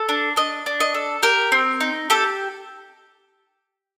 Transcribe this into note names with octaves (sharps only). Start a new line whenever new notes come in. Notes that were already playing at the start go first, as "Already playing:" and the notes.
Already playing: A4
D4
D4 D#5
D4
D#5
A4
G4 A#4
C4
D#4
G4 A4